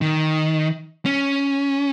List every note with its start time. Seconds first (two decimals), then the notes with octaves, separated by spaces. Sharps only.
0.01 D#3
1.05 C#4